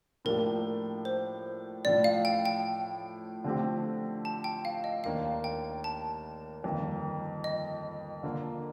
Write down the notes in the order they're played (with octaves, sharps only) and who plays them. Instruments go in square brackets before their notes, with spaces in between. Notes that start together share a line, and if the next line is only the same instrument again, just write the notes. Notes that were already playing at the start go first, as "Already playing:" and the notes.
[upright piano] A2 F3 A#3 D4 G4 [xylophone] A#4
[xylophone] C5
[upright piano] A1 A2 F3 [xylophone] D5
[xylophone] F5
G5
G5
[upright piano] D3 F3 A3 C4 G4
[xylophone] A5
G5
F5
D#5
[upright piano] D#2 D#3 A#3 D4 [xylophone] F5
[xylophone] G5
A5
[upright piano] G1 F2 D#3 A#3
[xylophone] D#5
[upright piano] D3 F3 A#3